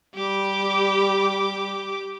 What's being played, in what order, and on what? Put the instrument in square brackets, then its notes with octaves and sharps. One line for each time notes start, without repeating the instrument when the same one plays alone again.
[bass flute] G3 [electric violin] G4 D6